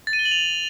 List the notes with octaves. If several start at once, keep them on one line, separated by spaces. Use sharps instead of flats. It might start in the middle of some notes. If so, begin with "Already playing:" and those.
A6
D#7
G7
F#7
F7